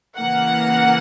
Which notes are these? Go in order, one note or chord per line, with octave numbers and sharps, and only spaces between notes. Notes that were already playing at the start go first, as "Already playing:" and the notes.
C#3 E3 A#3 F#5